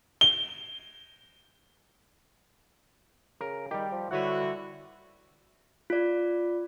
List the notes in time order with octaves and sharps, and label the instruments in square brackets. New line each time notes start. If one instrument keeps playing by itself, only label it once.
[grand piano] G7
[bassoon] C#3 [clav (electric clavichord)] A#4
[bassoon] D#3 [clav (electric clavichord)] G3 G4
[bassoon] F3
[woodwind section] D3 G3 F#4 [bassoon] E4 [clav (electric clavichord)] B4 C#5 F#5
[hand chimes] F4 D5